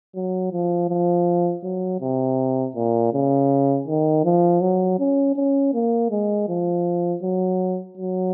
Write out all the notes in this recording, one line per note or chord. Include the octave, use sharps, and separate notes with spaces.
F#3
F3
F3
F#3
C3
A#2
C#3
D#3
F3
F#3
C#4
C#4
A#3
G#3
F3
F#3
F#3